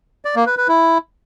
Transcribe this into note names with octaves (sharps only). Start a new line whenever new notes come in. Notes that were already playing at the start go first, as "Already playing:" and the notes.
D5
A#3
B4
B4
E4